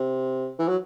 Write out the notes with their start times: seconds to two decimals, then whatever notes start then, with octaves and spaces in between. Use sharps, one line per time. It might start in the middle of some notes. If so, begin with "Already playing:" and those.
Already playing: C3
0.59 E3
0.68 F#3